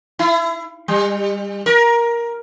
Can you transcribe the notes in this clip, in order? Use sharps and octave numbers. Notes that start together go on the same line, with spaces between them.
E4
G3
A#4